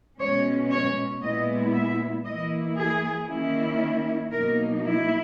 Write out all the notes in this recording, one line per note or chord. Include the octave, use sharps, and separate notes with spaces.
B2 G#3 C#4 C#5
C#5
A#2 G#3 B3 E4 D#5
E5
E3 A#3 E4 D#5
G#4
D#3 A#3 C#4 E4
B2 F#3 A#3 D#4 A#4
E4